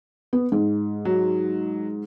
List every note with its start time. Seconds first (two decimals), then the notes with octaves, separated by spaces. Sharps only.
0.33 B3
0.52 G#2
1.05 F#3